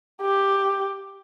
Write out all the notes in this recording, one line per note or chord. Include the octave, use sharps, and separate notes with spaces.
G4